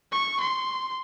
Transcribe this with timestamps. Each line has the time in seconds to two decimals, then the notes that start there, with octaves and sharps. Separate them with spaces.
0.12 C#6
0.40 C6